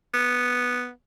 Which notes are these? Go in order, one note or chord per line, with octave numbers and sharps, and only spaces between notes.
B3